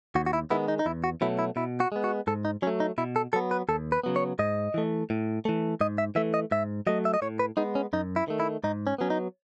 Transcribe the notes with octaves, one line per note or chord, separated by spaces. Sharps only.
D#2 F#4
F#4
E4
D#3 G#3 B3 E4
D#4
D#4
E2 E4
F#4
B2 F#3 A3 E4
E4
B2 E4
F#4
G#3 B3
F#4
G#2 A4
D#4
F#3 A3 C#4
D#4
B2 E4
A4
F#3 B3 A4
B4
D#2 A4
B4
C#3 F#3 B3
C#5
G#2 D#5
E3 A3
A2
E3 A3
G#2 D#5
E5
E3 A3 E5
D#5
G#2 E5
F#3 A3 D#5
E5
D#5
A2 C#5
B4
G#3 B3 D#4
C#4
F#2 D#4
E4
D#3 A3
E4
G#2 D#4
C#4
F#3 B3 C#4
D#4